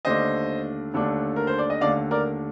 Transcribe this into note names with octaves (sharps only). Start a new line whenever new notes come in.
D#2 D3 A3 D4 C5 D#5
D#2 D3 A3 D4
A#4
C5
D5
D#5
D#2 D3 A3 D4 D5 F5
A#4 D5